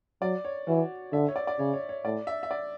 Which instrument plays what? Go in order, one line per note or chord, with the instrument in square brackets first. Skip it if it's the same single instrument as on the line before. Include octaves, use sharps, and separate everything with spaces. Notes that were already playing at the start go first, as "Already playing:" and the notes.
[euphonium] F#3 [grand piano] D5
[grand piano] C#5
[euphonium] E3 [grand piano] F#4
[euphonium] D3 [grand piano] E5
[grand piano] C#5
D5
D5
[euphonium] C#3 [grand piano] C#5
[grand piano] C#5
C#5
[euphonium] A2 [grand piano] D5
[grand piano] E5
E5
D5